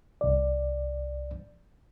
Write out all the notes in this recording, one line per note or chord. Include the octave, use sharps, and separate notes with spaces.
C2 D5